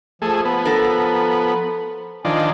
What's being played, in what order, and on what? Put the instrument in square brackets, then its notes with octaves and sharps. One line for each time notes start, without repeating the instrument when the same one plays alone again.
[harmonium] F3 [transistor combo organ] A3 G#4
[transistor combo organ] B3
[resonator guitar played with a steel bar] A4 A#4
[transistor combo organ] D#3 F3 D4 [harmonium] G#5